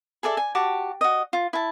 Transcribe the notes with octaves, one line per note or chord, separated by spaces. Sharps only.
G#4 A4 D5 E5
G#5
F#4 G4 A5 D6
F#4 D#5
F4
E4 A5